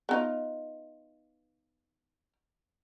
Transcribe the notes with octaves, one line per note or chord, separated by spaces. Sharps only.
B3 D#4 F4